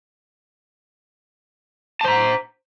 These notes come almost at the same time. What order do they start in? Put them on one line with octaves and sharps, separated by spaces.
A5 C5 A#5